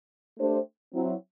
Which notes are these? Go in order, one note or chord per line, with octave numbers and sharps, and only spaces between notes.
A3 D4 G4 C5
F#3 C4 E4